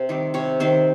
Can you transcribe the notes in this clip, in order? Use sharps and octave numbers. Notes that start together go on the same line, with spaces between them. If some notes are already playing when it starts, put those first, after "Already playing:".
Already playing: C3
D#3 G3 C4
C3 C#5
D#3 G3 C4 C5